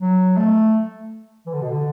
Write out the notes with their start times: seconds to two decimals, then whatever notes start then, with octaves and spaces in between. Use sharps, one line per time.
0.01 F#3
0.37 A3
1.46 E3
1.53 D3
1.62 B2
1.70 D3